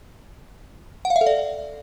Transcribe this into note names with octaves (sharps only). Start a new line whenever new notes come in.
F#5
F5
E5
A4
D5